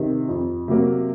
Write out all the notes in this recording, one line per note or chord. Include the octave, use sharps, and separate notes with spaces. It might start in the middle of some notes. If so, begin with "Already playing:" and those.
Already playing: C3 D#3 C4
F2
C3 F#3 A#3